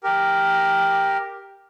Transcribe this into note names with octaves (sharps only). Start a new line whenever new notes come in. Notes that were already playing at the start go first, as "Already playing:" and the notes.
G4 A#4